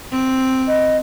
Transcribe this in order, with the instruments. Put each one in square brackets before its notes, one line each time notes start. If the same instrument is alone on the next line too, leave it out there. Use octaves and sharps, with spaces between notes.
[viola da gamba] C4
[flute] D#5